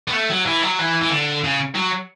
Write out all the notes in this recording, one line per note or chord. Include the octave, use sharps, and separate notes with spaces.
B3
A3
F#3
E3
F#3
E3
E3
D3
C#3
F#3